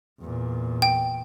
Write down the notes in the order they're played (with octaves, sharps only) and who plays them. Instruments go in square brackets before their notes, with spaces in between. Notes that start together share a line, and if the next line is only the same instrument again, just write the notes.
[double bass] E2 A#2
[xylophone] G5